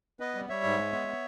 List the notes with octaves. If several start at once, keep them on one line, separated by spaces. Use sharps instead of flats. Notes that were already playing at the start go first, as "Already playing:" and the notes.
B3 B4 D#5
G3
G3 C#5 E5
G#2
G#3
B3
B3